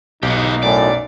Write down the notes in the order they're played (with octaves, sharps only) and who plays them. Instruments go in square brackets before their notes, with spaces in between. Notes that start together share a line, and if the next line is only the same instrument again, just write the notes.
[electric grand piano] B1 [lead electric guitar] B3 G4 [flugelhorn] D#4
[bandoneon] F#2 A2 [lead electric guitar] D5